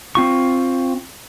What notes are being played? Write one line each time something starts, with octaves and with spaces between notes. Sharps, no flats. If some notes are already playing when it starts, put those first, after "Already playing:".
C4 F4 C#6